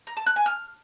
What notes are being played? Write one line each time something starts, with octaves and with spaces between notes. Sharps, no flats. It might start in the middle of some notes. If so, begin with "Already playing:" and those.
A#5
A5
F#6
G#5
F6